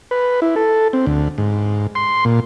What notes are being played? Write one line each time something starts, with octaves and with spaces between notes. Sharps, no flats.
B4
E4
A4
C4
D2
G#2
C6
A#2